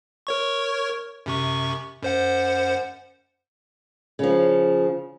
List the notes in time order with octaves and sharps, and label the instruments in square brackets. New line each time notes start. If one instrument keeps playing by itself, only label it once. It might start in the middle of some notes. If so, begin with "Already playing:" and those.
[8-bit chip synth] A#4 C#5 C#6
F#2 C3 C#6
F#2 C5 F#5
[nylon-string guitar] C#3 F3